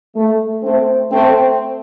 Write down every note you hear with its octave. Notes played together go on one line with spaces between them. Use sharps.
A3
A3 C4
A3 C4